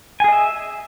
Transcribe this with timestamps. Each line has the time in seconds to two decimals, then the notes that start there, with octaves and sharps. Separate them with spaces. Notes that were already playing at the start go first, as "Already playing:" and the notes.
0.20 G#5
0.24 G#4
0.28 D#5
0.32 E5